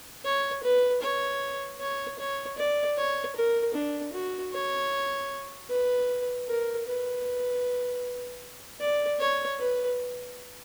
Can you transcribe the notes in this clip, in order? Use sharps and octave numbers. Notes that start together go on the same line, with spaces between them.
C#5
B4
C#5
C#5
C#5
D5
C#5
A#4
D4
F#4
C#5
B4
A#4
B4
D5
C#5
B4